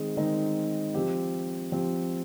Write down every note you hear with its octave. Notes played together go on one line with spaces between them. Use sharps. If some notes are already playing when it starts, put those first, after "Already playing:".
Already playing: D#3 G#3 C4 D#4 G#4
D#3 G#3 C4 D#4 G#4
F3 C4 G4
F3 C4 G4